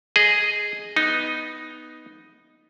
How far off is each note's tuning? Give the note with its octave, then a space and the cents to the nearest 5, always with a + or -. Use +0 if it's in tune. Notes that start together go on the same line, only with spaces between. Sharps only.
G#4 +0 D#5 -5
B3 +0 D#4 +0